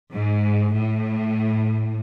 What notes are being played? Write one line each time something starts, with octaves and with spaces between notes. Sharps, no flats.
G#2
A2